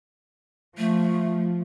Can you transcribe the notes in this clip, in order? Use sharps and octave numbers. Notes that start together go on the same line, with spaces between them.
F3 A3